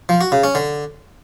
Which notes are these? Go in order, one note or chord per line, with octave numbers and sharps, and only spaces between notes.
F3
F#4
C#3
C#4
D3